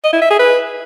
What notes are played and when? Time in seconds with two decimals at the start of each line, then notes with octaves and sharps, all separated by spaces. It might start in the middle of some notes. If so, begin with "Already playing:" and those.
0.04 D#5
0.13 E4
0.21 E5
0.30 G#4
0.39 B4